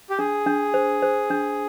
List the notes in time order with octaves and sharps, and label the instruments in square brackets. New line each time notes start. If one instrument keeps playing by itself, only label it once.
[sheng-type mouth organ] G4
[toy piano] D4 [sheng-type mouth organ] G#4
[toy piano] D4
C5
C5
D4